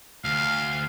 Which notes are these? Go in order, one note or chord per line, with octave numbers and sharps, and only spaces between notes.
D2 F5